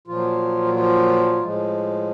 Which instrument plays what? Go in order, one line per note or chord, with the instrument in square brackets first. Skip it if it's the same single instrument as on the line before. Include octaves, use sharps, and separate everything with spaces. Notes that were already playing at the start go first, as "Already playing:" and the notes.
[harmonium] A#2 F3 F#3 F4
F3 F4
A2 F3 G#3